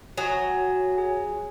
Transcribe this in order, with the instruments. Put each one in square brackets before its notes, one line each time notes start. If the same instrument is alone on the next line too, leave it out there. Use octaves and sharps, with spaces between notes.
[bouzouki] F#3 [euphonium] F#4 [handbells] C#5 G#5 D#6
[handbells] G#4 G#5